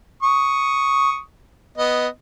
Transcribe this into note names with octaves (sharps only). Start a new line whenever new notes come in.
C#6 D#6
B3 D#5